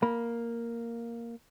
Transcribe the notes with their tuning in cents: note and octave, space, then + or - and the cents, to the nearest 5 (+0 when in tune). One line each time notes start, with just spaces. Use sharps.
A#3 +0 B5 -15